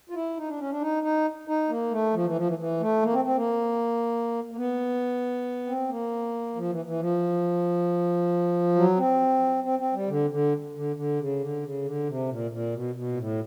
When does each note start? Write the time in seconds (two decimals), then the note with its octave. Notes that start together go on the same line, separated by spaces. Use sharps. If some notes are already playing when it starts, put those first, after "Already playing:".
0.09 F4
0.15 E4
0.37 D#4
0.48 D4
0.59 C#4
0.71 D4
0.81 D#4
1.03 D#4
1.47 D#4
1.69 A#3
1.91 A3
2.14 F3
2.25 E3
2.36 F3
2.47 E3
2.58 E3
2.80 A3
3.03 A#3
3.13 C4
3.25 C4
3.36 A#3
4.52 A#3
4.57 B3
5.67 C4
5.89 A#3
6.55 F3
6.69 E3
6.85 E3
7.00 F3
8.75 F#3
8.97 C4
9.64 C4
9.79 C4
9.93 G3
10.08 D3
10.30 D3
10.75 D3
10.96 D3
11.19 C#3
11.41 D3
11.63 C#3
11.84 D3
12.07 C3
12.28 A#2
12.51 A#2
12.73 B2
12.95 B2
13.12 A#2
13.17 A2